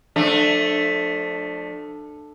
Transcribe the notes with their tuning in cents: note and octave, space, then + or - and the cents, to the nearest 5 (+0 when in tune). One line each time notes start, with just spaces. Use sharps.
F3 +40 A3 +0 D4 +25